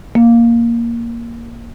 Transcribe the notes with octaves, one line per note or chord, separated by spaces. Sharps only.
A#3